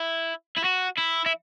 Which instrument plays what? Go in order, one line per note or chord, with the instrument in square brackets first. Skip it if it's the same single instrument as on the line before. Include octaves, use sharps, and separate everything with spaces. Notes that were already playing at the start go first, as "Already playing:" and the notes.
Already playing: [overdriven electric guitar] E4
E4
F#4
E4
E4